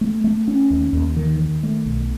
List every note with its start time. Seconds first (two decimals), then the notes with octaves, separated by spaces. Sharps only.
0.01 A3
0.24 A3
0.48 C#4
0.70 D#2
0.93 D#2
1.16 D#3
1.40 D#3
1.63 A3
1.86 B1